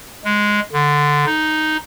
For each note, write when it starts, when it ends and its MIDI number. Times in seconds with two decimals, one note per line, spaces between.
0.25 0.60 56
0.73 1.25 50
1.26 1.77 63